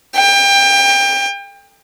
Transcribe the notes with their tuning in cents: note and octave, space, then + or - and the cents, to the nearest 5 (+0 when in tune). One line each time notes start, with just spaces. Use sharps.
G5 +25